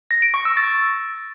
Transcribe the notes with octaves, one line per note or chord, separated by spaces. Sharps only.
A#6
D7
C#6
E6
A6